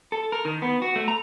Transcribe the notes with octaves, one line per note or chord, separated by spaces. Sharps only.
A4
A#4
D#3
B3
F#4
A3
A#5